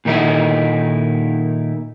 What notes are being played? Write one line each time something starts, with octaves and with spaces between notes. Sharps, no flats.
A#2 D#3 D#4 E4 A4 D#5